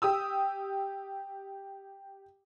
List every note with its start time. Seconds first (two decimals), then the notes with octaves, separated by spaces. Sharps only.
0.02 G4 D#6 E6